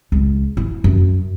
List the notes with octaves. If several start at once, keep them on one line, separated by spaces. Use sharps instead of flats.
C#2
E4
F#2